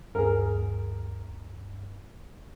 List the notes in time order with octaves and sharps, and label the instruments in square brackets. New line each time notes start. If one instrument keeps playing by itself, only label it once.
[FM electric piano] D2 G2 [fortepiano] G#4 A#4